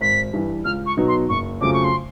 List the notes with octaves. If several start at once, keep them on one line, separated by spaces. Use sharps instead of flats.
G#1 B6
G2 E3
C#2 F6
C#6
B2 F#3 B3 D#4
C6
F#1 C#6
F2 C#3 F#3 A3 D6
C#6
C6